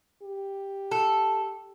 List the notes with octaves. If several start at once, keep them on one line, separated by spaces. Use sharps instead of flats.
G4
A4